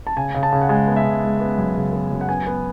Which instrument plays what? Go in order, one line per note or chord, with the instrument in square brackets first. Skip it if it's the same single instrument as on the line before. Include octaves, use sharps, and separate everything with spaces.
[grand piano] A5
C#3 G#5
C#3
A5
C#3
F#5
G#3 G#5
B3
E5
C#3
G#3
B3
F#2
C#3
B3
F#2
F#5
B3 G#5
B3